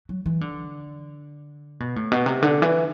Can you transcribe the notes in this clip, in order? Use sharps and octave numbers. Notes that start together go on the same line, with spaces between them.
F#3
E3
D3
B2
A2
B2
C3
D3
E3